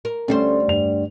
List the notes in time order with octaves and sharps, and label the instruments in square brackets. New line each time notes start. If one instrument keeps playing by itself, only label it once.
[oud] A#4
[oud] D2 G3 C5 [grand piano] A3 C#4
[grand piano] G2 F7